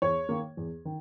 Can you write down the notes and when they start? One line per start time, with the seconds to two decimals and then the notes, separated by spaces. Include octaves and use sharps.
0.02 E2 C#5
0.29 D#3 A#3
0.57 E2
0.85 D#3